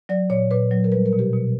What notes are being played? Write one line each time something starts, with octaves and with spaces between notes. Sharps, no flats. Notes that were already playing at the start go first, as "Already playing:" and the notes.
F#3 D5
A#2 C#5
A#2 B4
F#3
A#4
G3 B4
A#4
B2
G4
B2